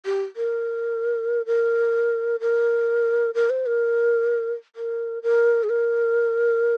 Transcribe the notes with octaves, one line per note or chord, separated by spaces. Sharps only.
G4
A#4
A#4
A#4
A#4
C5
A#4
A#4
A#4
G#4
A#4